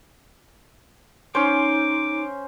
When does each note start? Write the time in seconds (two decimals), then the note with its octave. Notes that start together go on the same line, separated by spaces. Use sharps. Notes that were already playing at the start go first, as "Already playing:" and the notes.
1.35 C#4 D#4 C5 D6